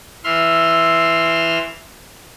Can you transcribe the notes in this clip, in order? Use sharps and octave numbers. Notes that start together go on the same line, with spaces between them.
E3 E5 C6 F6